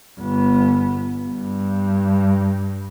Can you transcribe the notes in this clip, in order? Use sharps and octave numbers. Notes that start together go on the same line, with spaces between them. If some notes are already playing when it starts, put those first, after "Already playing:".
G1 B3
G2